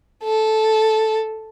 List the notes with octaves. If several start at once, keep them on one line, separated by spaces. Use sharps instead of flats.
A4